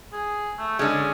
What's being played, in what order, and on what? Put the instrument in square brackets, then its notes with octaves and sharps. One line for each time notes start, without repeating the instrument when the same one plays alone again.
[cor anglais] G#4
A3
[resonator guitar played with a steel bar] D3 G#3 [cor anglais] C#4